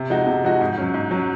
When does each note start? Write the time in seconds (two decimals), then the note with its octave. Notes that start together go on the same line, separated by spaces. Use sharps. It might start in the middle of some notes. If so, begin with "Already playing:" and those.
Already playing: C3
0.10 F3 G#3 D#4 F#4
0.27 C3
0.44 F3 G#3 D#4 F#4
0.61 G#2
0.78 F#3 C#4
0.94 G#2
1.11 F#3 C#4